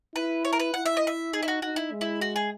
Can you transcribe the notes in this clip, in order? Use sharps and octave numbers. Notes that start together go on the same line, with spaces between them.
E4 B4
C#5
A#4
B4
E4 F#5
E5
D#5
E5
D#4 G#4
E4
F#4
D#4 F#4
E4
G#3
E4
F#4
G#4